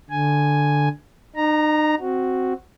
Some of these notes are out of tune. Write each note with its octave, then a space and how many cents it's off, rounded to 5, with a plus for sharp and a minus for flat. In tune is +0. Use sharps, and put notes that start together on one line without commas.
D3 +0 G#5 +0
D#4 -40 A#5 +0
C4 +0 F#4 +0